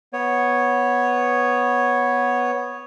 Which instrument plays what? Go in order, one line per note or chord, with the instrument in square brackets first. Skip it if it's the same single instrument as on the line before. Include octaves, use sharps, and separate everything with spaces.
[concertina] B3 C#5